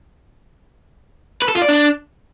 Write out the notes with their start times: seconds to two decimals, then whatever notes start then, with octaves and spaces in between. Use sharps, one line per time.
1.42 B4
1.48 A4
1.55 F4
1.62 D5
1.68 D4